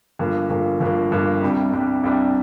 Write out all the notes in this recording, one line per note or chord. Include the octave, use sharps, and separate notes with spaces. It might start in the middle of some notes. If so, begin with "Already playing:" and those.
G1 G2 F3 A#3
G1 G2 F3 A#3
G1 G2 F3 A#3
G1 G2 F3 A#3
C2 C3 G3 D4
C2 C3 G3 D4
C2 C3 G3 D4